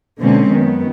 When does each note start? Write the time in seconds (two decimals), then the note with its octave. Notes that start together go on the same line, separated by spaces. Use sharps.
0.18 B2 D3 G#3 A#3 C4 C#4
0.49 F#2 D#3 B3